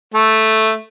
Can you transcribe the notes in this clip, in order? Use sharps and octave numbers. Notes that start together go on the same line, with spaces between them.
A3